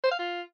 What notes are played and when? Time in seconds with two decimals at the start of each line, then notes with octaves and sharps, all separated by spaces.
0.04 C5
0.11 F5
0.19 F4